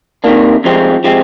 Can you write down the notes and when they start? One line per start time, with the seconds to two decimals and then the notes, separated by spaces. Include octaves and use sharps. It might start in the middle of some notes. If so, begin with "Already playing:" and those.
0.24 C3 D#3 A#3 D4
0.64 F2 C3 F3 G#3 C4
1.04 C3 F3 G#3 C4